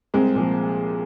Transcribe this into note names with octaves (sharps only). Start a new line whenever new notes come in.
C2 G#3 C4
A#2 F3